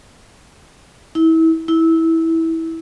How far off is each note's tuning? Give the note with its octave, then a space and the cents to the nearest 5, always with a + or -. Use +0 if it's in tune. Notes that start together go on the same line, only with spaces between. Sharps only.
E4 -30
E4 -15